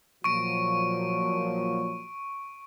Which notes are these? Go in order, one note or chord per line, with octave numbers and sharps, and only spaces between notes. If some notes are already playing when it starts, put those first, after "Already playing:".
A#2 F3 F#3 C#6 D7